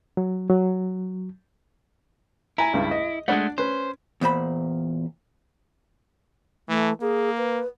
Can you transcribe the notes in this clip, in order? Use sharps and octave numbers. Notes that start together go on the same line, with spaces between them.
F#3
F#3
E4 G#5 A#5
C#2 G2
D#5
G#3 A3 D4 D5 F#5
C#4 B4 C5
E2 A#2 C5 B5
E3 A3
A#3 G#4
B4